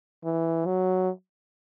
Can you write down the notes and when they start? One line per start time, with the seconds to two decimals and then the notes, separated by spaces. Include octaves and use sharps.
0.24 E3
0.66 F#3